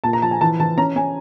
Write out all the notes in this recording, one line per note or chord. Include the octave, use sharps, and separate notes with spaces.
A#2 A5
A#5
F3 A5
G#5
E3 A5
E3 A5
C#4 A#5
C#4 G#5